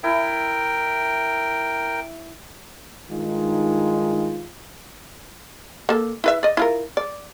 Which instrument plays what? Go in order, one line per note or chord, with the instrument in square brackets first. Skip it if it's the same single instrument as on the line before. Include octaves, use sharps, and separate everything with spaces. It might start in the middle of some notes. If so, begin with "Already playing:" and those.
[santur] E4 [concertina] A#4 G5
[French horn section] G2 D#3 G#3 D#4 F4
[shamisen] A#3 A4
E4 B4 E5
D5 D#5
E4 F4 A#4
D5